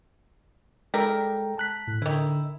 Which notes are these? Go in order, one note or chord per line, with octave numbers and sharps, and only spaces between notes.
G3 G#3 E4 A4 A#4 G5
A5 F#6 B6
A2
D3 D#3 E4